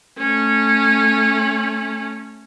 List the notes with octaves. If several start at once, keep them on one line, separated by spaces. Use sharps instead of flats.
A3 C#4